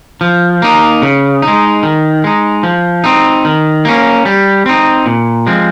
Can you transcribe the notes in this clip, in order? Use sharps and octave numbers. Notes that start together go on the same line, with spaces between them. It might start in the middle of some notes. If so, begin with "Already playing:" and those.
F3
A#3 D#4
C#3
G#3 D#4
D#3
G#3 D#4
F3
C4 D#4
D#3
A#3 C#4
G3
C4 D#4
A#2
F3 G#3 C4